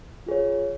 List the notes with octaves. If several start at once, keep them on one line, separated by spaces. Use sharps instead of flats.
F4 G#4 C#5